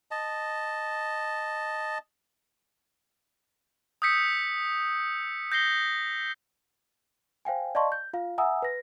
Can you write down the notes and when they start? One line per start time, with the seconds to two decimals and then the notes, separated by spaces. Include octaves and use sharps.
0.11 D#5 A5
4.02 D#6 E6 G6 B6 C#7
5.52 G6 A#6 C7 G7
7.45 C5 F5 G5 G#5
7.75 D5 D#5 F5 A5 C6 C#6
7.92 G6
8.13 F4 F5
8.38 E5 F#5 G#5 A#5 D#6 E6
8.62 B4 A#6